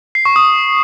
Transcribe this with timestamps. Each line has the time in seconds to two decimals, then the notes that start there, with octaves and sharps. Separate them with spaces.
0.15 C7
0.25 C#6
0.36 D#6